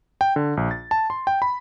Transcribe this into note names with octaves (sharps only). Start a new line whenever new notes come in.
G5
D3
A#1
A6
A5
C6
G5
B5